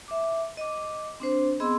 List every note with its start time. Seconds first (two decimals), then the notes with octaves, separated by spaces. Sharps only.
0.08 E5 D6
0.57 D#5 D6
1.20 C4 D4 C5
1.60 B3 C4 G#4 D#5 C6 E6